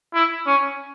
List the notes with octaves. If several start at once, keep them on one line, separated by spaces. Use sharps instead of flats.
E4
C#4